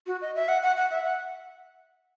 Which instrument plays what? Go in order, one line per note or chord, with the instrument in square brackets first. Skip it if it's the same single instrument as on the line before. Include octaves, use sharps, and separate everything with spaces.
[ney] F#4
D#5
E5
F#5
F#5
F#5
E5
F#5